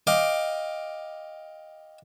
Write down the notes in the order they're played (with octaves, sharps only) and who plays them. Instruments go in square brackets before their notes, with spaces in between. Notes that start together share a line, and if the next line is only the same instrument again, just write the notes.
[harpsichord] D#5 F5 G5 D6